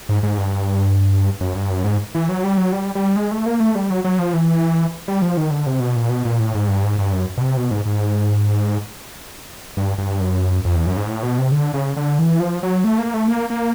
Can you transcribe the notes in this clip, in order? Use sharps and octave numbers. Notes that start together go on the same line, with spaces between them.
G#2
G#2
G2
F#2
G2
F#2
G#2
E3
F#3
G3
F#3
G3
G3
G#3
A3
A#3
A3
G3
F#3
F#3
F3
E3
G3
F3
D#3
D3
C3
B2
A#2
B2
A#2
A2
G#2
G2
G#2
G2
F#2
B2
C3
B2
G#2
G#2
G2
G2
F#2
F2
E2
F#2
G#2
A2
B2
C3
D3
C#3
D3
E3
F3
F#3
A3
A#3
A3
A#3
A#3